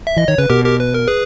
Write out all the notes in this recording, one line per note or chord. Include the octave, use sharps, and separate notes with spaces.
E5
E3 D#5
D#3 C#5
C#3 B4
B2 G4 A#4
G4 A#4
B4
A#4
G#4 B4